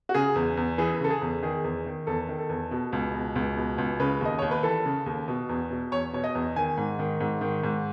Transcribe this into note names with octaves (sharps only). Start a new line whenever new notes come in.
F#4
C#3 G#4
E2
E2
E3 G#4
C#3 A4
G#4
E2
D#3 G#4
E2
D#3
E2 A4
D#3
A4
E2
B2
C#2
B2
C#2
B2
C#2
C#3 B4
D#2 D#5
D#2 C#5
B4
E3 A4
C#3
D#2
B2
E2
B2
E2 C#5
B2 C#5
D#5
E2
D#3 G#5
G#2
D#3
G#2
D#3
G#2